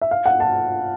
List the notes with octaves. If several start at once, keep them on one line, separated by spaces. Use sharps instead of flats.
E5
F5
F#5
A5